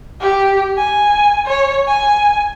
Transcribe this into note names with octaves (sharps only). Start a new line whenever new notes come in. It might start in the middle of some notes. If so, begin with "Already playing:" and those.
G4
G#5
C#5
G#5